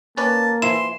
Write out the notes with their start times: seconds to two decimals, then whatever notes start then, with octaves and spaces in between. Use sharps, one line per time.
0.17 A#3 C#4 B4 D5 A5
0.62 E3 F3 E4 C6 E7